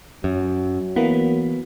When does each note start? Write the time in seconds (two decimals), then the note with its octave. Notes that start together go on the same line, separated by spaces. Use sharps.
0.24 F#2 F#3
0.96 E3 A#3 B3